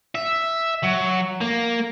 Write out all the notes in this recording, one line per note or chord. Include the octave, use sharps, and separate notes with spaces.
E5
F#3
A#3